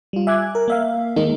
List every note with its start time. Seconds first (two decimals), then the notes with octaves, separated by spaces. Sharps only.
0.13 G3 F4
0.27 E5 G#5 D6 F#6 G#6
0.55 A#4
0.68 A#3 E5 F5
1.16 D#3 G#3 A#3 D#4